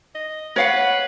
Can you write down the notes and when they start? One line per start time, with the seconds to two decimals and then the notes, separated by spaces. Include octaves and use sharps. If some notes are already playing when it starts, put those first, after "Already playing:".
0.15 D#5
0.56 B4 C#5 F5 F#5